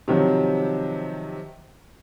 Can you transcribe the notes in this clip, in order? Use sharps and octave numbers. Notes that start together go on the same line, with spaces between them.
C3 D#3 F3 F#3